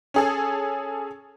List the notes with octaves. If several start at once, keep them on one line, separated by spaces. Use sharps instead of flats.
C#4 G#4 A4